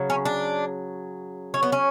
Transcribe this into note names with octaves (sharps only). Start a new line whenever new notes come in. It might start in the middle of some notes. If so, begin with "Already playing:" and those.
Already playing: C#3 F#3
C#4
D4
C#4
B3
C#4